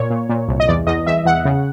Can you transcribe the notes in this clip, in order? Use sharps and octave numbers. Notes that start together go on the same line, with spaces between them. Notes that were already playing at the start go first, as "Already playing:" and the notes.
Already playing: A#2 C#5
A#2
A#2
C2
D#5
E2 D5
E2 D#5
E2 E5
E2 F#5
C#3